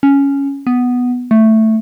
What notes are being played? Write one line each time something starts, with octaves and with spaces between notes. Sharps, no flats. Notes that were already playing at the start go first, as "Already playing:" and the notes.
C#4
B3
A3